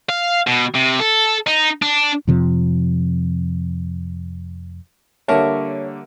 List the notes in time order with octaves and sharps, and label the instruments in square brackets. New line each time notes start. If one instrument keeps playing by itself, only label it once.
[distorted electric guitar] F5
B2
C3
A4
D#4
D4
[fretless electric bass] F2 C3 F3
[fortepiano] D3 G3 A#3 [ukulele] A#4 E5 A5 [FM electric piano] C#5